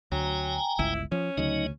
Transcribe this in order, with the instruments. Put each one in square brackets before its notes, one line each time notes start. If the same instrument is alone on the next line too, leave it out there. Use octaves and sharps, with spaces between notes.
[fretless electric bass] D2 [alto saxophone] F#3 [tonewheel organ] G5 G#5 A#5
[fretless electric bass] G1 C#2 [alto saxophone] E4
[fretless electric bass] F3 [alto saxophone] C#4
[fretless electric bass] D2 C#3 [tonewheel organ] F#3 D#4 D#5